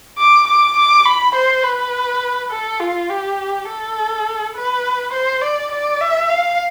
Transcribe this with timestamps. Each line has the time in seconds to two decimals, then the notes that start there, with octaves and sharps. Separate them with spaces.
0.18 D6
0.47 D6
0.77 D6
1.06 B5
1.35 C5
1.64 B4
2.51 A4
2.80 F4
3.10 G4
3.68 A4
4.55 B4
5.13 C5
5.42 D5
5.72 D5
6.01 E5
6.30 F5